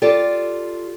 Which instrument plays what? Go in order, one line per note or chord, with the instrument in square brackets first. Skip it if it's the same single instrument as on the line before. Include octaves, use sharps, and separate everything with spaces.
[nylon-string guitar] F4 G4 A4 D5